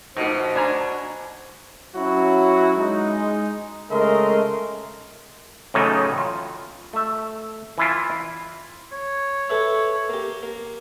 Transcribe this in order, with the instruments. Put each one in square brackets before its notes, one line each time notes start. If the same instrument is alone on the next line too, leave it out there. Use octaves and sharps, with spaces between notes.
[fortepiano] A#1 D#4 [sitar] B2 [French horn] C5
[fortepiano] D4 G#5 A#5
[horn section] F#3 C#4 E4 F#4
G#3 D#4
C#3 G#3 A3 A#4 D#5 C6
[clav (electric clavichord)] A2 C#3 E3 F#3 A3 D#4
F4
A3 E5
E3 E4 F4
[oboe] C#5
[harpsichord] A4 B4 E5
A#3 G4
A#3